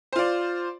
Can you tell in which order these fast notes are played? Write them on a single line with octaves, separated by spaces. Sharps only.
C5 F4 D5